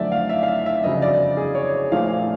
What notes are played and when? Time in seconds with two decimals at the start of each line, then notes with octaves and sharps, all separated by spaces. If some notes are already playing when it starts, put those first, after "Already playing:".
Already playing: F#2 D3 F3 A3 D5 E5
0.12 F5
0.29 E5
0.43 F5
0.48 E5
0.66 E5
0.83 G1 F2 C#3 F#3 D#5
1.02 D5
1.37 G#4
1.55 C#5
1.92 A#1 A#2 F3 A3 F5